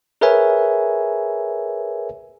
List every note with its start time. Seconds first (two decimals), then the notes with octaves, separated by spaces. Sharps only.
0.21 G#4 A#4 B4 C#5 E5 G#5